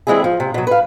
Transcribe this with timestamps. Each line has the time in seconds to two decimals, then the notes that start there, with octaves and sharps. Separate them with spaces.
0.07 E3 G3 G#3 C4 E4 G#4
0.24 F3
0.40 C3
0.54 B2 F#3
0.67 B4 F5